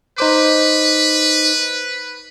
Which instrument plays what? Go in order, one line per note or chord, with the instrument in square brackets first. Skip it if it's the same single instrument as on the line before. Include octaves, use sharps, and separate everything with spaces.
[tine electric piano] D#4 C5 D6 [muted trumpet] B4